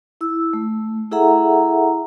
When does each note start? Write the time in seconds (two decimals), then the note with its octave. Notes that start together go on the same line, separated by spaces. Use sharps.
0.21 E4 E6
0.53 A3
1.12 E4 G#4 A4 E5 F#5 A#5